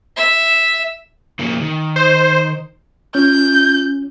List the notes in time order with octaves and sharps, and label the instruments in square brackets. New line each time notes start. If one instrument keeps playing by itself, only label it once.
[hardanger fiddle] E5
[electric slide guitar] C#3 F3 A#3
D#3
[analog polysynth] C5
[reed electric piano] C#4 [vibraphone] F4 [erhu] G6